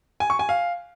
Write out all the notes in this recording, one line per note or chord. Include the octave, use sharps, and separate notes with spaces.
G#5
C#6
G#5
F5